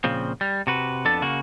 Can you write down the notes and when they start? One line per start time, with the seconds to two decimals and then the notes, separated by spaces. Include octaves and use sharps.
0.04 A#2 C#3 F3 C4
0.41 G3
0.67 C3 F#4 B4
1.05 F2 B3 D4 A4 A5
1.22 C#3 A#3 F#4